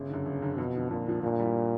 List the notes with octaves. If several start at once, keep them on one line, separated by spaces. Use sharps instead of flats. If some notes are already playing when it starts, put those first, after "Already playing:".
Already playing: G1 C#3
F#2 D3
G1
F#2 D3
F2 B2
D3 F3
F2 A#2
D3 F3
G2 A#2
E3 G3